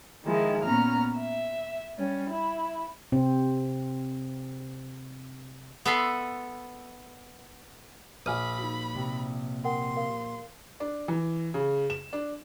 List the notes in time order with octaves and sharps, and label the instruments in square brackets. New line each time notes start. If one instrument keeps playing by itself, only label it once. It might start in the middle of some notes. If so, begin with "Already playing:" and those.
[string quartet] D#3 F3 G#3 E4
A#2 B3 C#4 A#5 F6
E5
G3 C#4
E4
[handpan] C3 C4
[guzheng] B3 A4 E5 B5 C6
[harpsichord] A#1 [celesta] G#5 F6 D#7 [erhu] B5
[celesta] D#4 F#4
[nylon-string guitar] C3
[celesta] A#4 F#5 G5 [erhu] C6
[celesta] A#4 F5
[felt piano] D4
E3
C#3
E7
D4